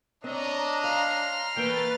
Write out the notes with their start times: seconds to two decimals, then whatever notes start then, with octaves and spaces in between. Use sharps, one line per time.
0.24 C4 D4 C#5 D#5 A#5
0.84 C#5 F5 C6 F6
1.56 E3 A3 A#3 B4 G5 A6